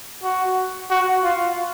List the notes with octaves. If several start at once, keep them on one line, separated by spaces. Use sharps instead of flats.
F#4
F#4
F4